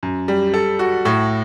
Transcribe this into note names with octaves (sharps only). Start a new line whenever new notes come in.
F#2
G3
A4
F#4
A2